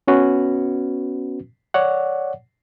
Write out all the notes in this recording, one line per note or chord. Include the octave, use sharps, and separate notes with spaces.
B3 C#4 F#4 B4
C#5 D5 F#5